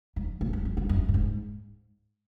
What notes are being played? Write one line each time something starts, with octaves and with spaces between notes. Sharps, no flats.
G#2
A2
G#2
G2
G2
F#2
A2
G#2